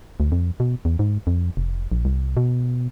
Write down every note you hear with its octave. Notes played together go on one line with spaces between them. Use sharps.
D2
F2
B2
E2
G#2
F2
F1
A#1
C2
B2